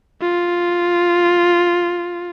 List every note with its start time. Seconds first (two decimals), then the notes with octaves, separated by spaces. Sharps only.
0.22 F4